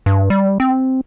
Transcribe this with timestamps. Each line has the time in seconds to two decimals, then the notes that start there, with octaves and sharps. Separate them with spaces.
0.06 G2
0.30 G3
0.60 C4